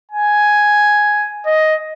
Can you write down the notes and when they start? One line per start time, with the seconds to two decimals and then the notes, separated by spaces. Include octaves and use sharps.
0.12 G#5
1.46 D#5